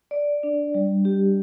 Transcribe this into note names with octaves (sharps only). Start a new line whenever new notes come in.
D5
D4
G3
G4